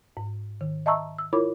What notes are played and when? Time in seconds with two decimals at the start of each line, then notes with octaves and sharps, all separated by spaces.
0.17 G#2
0.61 D#3
0.86 D#5 E5 A5 A#5 C#6 E6
1.19 E6
1.33 E4 F4 A#4 C#5 B5 D6